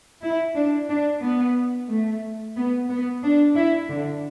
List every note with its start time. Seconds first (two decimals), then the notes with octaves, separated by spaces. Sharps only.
0.22 E4
0.56 D4
0.89 D4
1.22 B3
1.89 A3
2.56 B3
2.89 B3
3.23 D4
3.55 E4
3.89 D3